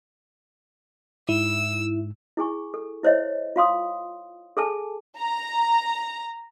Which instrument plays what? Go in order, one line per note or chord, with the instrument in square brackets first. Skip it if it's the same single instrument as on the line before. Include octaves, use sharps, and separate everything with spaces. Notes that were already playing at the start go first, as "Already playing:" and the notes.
[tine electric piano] G#2 [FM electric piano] E4 [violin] E6
[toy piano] E4 G#4 G#5 C#6
A4
E4 C5 C#5 D#5 E5
F4 F5 C6 D#6
G#4 A4 G#5 A5
[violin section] A#5